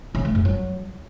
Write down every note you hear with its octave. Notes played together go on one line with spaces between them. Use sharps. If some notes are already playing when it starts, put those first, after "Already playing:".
C#3
A3
F#2
F#3